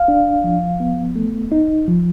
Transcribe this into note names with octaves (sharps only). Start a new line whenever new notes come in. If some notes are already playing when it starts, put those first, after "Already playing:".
Already playing: F5
D4
F3
B3
A3
D#4
F3